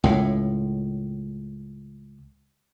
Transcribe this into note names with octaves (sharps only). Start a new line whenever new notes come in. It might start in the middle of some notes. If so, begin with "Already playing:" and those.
C#2 A2